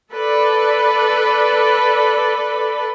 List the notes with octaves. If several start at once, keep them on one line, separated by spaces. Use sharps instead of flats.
A4 B4 D5